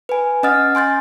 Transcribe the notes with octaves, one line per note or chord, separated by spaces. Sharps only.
B4 G#5
C#4 D#5 F#5 D#6 F6 A6
G#5 C6 G6 A6